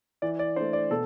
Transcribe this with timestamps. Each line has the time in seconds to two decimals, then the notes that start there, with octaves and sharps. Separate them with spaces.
0.22 E3 D5
0.39 D5
0.56 A3 D4 C5
0.73 D5
0.90 B2 A4